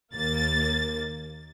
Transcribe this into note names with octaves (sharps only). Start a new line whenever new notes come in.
D#2 A#3 A6